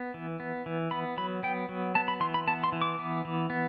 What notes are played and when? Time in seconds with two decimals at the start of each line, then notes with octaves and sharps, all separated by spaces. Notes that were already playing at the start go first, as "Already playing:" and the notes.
Already playing: B3
0.14 E3
0.40 B3
0.66 E3
0.91 B3 B5
1.17 F#3 B5
1.43 B3 G5
1.69 F#3
1.95 B3 A5
2.08 B5
2.20 E3 C6
2.34 B5
2.47 B3 A5
2.64 C6
2.72 E3
2.82 D6
2.99 B3
3.25 E3
3.50 B3